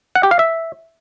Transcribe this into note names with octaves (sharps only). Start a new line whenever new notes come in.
F#5
G4
F5
E5